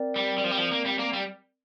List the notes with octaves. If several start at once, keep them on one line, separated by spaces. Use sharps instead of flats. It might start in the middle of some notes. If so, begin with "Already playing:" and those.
Already playing: C4 A#4 D5
G3
G3
F3
G3
F3
A#3
G3
A#3
G3